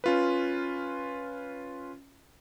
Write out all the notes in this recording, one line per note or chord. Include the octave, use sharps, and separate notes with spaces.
C#4 F4 B4